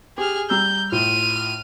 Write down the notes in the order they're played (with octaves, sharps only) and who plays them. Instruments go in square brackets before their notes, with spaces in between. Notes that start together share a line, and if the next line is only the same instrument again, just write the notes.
[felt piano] G4 [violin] G#4 F6
[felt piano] G3 A#5 E6 [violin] G6
[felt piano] A2 F4 [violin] F6 D#7